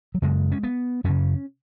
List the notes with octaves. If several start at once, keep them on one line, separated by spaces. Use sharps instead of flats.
F#3
F#2 C#3 G#3
C#4
B3
F#2 C#3 C#4